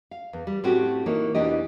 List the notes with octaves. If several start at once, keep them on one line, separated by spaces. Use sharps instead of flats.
F5
E2
G3
A2 A3 C4 C#4 F#4 G4
E3 A#3 D#4 C#5
E2 B2 E3 D4 G4 D#5